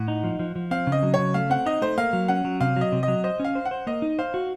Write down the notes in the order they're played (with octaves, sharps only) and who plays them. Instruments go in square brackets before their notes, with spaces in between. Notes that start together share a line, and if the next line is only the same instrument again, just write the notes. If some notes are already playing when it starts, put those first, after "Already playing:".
Already playing: [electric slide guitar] A2 [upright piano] F#5
[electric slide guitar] D#4
F3
F3
F3
[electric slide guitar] C4 [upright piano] F5
[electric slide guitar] C#3
[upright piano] D#5
[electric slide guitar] F#3
[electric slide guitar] C#3 [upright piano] C#5
[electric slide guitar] A3 [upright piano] F5
[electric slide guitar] C4 [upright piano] F#5
[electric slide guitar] D#4 [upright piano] D#5
[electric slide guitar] A3 [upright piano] C5
[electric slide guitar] A#3 [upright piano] F5
[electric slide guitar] F#3
[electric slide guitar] C#4 [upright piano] F#5
[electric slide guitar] F#3
[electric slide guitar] C3 [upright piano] F5
[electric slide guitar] F#3 [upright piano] D#5
[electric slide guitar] C3
[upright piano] D#5
[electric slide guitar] F#3
[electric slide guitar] C5 [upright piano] D#5
[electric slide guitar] C#4 [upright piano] F5
[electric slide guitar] C5
[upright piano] F#5
[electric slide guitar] C5
[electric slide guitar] A#3 [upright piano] D#5
[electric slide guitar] D#4
[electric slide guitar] C5 [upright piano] F5
[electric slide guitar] F#4